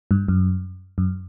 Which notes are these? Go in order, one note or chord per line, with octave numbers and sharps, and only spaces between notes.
G2
F#2
F#2